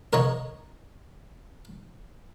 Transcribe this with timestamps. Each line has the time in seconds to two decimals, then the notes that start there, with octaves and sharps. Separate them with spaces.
0.13 A#4 C#5 D#5